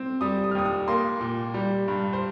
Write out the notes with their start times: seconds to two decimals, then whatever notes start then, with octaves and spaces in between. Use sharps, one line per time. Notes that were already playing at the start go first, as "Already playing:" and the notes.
Already playing: C4
0.21 G3 D#6
0.44 D#6
0.51 F6
0.55 D#2 D#6
0.65 D#6
0.88 A#3 C6
1.20 A#2
1.54 G3
1.88 G2
2.13 C5